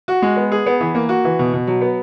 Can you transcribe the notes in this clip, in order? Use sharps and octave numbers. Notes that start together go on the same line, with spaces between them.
F#4
G#3
B3
G#4
B3
E3
A#3
F#4
E3
B2
B2
F#3
B3